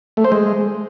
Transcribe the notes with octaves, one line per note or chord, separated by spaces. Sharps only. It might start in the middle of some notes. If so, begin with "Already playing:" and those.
A3
C5
G#3